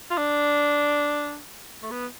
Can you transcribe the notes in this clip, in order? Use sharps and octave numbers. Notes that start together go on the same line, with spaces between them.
F4
D4
A3
B3